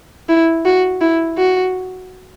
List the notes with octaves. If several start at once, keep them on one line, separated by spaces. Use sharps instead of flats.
E4
F#4
E4
F#4